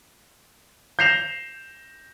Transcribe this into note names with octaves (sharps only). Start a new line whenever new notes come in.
G6 A#6 C7 E7 F7